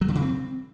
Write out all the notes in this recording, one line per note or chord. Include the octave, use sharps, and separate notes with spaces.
F#3
D3
C#3
C4